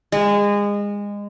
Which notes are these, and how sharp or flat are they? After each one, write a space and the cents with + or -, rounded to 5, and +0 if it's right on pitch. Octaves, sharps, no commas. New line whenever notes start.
G#3 -25